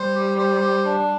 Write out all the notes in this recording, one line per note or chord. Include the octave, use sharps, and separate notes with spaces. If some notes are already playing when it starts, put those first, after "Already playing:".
Already playing: G3 C5
G4
C5
G4
D4